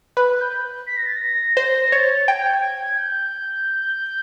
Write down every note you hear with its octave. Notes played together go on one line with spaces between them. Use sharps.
B4 F#6
G6
B6
A#6
A6
A#6
C5 A#6
C#5 A6
G5 G#6
G6
G#6
G6